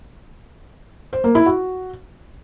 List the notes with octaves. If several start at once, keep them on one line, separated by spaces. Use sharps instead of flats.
C5
A#3
E4
F#4